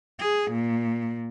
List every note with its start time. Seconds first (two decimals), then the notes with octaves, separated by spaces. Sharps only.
0.20 G#4
0.52 A#2